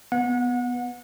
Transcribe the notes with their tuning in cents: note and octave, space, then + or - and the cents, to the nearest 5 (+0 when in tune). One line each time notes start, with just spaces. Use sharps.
B3 +0 F#5 -30